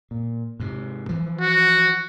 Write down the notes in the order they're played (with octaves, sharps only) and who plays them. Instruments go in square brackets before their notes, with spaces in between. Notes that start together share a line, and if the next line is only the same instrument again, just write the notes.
[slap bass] A#2
G#2 C3
E3 F3
[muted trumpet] F#4